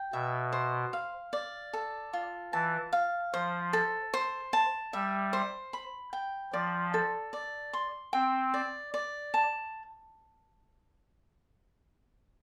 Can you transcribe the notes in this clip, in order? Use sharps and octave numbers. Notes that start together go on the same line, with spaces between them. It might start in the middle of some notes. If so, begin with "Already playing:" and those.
Already playing: G5
B2 E5
C5
F5
D5
A4
F4
E3 A5
F5
F3 C5
A4
C5
A5
G3 E5
C5
B5
G5
F3 D5
A4
D5
C6
C4 G5
D5
D5
A5